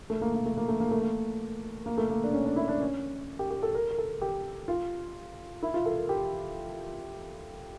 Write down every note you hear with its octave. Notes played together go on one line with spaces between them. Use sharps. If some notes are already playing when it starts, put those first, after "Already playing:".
A3
A#3
A#3
A3
A#3
A3
A#3
A3
A#3
A#3
A3
A#3
D4
C#4
D4
E4
D4
C#4
G4
G4
A4
A#4
A#4
A4
G4
F4
E4
F4
A4
A#4
G4